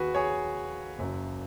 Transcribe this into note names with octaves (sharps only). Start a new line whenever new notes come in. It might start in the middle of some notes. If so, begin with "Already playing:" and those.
Already playing: D#2 D#3 F#4 G#4 B4
G#4 C#5
F#1 F#2 C#3